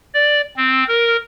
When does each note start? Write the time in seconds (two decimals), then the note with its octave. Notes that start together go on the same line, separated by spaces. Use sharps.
0.14 D5
0.57 C4
0.88 A#4